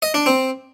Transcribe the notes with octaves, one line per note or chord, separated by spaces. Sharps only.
D#5
D4
C4